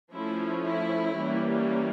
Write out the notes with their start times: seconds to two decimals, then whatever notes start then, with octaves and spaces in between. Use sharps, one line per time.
0.12 F3 A3 C#4 E4
0.64 E4
1.15 E3 G3 A#3 C#4